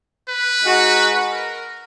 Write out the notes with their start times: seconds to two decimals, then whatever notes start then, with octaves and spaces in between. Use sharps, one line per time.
0.28 B4
0.62 G#3 D#4 F#4
1.31 A#4